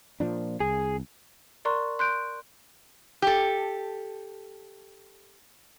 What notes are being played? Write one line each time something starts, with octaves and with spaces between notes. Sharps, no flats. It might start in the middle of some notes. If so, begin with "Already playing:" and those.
A#2 F3 D4
C2 G#4
A#4 D5 A#5 C6 C#6 F#6
C6 F#6 G6 D7
G4 A4